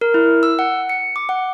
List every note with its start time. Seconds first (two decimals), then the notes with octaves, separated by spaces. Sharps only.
0.01 A#4
0.14 E4
0.43 E6
0.59 F#5
0.89 C#7
1.16 D6
1.29 F#5